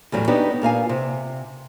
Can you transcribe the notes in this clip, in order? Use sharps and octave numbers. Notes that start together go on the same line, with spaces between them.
E2 A2 F#3 G3
B3 D4 D#4 F#4 G4 C#5
A#2 A#3 F5 G#5
C3